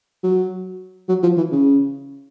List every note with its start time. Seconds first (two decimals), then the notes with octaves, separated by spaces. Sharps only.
0.23 F#3
1.09 F#3
1.23 F3
1.37 E3
1.52 C#3